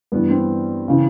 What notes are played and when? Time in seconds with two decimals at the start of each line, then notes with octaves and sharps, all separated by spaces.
0.12 G2 E3 B3
0.30 C4
0.88 C#3 E3